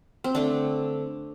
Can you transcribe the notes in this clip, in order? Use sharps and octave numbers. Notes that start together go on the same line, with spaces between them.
C4
D3 A3 C4 D4